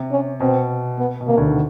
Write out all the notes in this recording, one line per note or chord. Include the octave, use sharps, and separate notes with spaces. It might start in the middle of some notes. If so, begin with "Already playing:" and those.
Already playing: C3
C#4
B2 C4
B3
B2
C3 A#3
D2 D3
D#3